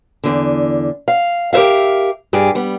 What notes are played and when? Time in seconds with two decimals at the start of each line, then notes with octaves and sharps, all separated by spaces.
0.24 E2 D3
1.08 F5
1.53 G4 A#4 C5 E5 F5
2.33 G2 G4 G#4
2.55 G3 B3